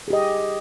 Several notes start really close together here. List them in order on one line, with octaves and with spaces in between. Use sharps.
G#4 G4 D#5